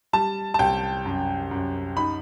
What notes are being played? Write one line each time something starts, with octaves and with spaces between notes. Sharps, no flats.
G3 A5
A5
C2 G5
F#2
F#2
D#4 B5